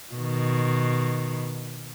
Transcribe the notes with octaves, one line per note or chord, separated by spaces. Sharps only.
B2 D#3